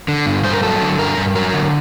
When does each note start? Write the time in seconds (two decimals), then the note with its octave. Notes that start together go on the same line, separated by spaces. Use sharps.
0.08 D3
0.26 G2
0.44 G2 C5
0.53 A#4
0.63 F#3 A4
0.81 D3
0.99 G2 A#4
1.17 G2
1.35 F#3 A#4
1.53 D3